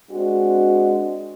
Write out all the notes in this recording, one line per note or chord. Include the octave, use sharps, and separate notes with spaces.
G#3 C4 D4 F#4